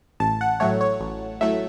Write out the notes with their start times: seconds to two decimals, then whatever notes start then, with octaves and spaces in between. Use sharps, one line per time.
0.20 A1 A5
0.41 F#5
0.60 A2 F#3 A3 C#5
0.81 C#5
1.00 A1
1.41 A2 F#3 A3 E5